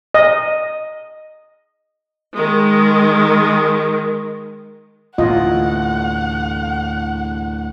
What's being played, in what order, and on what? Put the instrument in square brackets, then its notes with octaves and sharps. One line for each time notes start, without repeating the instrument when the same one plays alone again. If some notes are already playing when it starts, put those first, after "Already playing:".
[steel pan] D#5
[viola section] D#3 G#3
[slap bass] D2 A2 E3 [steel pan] F4 D#5 [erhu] F#5